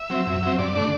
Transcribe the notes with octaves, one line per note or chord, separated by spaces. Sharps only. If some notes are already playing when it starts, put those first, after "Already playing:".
Already playing: E5
F#3 C4
F#2
F#3 C4
G2 D5
D3 A3 D4